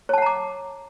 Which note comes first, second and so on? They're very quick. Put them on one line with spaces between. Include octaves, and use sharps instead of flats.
C#5 A5 F#5 A#5 D6